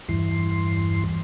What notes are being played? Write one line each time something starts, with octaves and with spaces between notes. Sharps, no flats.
E2 G2 E3 C6